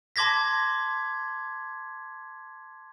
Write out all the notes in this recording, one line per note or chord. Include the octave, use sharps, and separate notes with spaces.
A5 C6 D6 G#6 A#6 B6